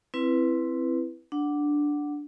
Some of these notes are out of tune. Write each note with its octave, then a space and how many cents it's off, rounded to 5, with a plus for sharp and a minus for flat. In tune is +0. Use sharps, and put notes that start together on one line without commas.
C4 +0 E4 +10 B4 +0
D4 +0 F#5 +0